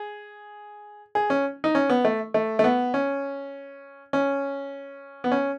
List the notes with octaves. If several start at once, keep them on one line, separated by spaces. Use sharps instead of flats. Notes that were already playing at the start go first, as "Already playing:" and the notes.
Already playing: G#4
G#4
C#4
D#4
C#4
B3
A3
A3
A3
B3
C#4
C#4
B3
C#4